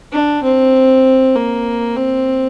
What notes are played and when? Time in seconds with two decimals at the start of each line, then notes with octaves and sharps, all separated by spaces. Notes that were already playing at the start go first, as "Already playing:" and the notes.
0.12 D4
0.43 C4
1.35 A#3
1.96 C4